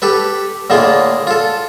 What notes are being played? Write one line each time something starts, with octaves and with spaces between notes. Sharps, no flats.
G4 A4 B4
A2 D3 A#3 F4 G#4
F4 A4